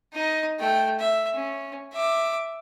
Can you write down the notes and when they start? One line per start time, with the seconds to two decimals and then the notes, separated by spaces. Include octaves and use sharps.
0.13 D#4 D#5
0.59 A3 G5
0.99 E5
1.34 C#4
1.93 E5 D6